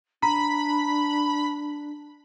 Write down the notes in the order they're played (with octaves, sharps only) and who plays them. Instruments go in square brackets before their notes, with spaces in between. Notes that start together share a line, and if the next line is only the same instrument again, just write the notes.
[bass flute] D4 [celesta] A#5 [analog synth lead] B5